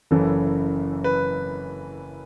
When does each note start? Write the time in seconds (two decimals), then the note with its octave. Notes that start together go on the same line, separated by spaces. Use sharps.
0.11 F#1 F#2 E3 A4
1.04 B4